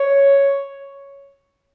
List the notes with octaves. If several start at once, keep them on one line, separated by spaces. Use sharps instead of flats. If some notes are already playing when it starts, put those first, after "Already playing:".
Already playing: C#5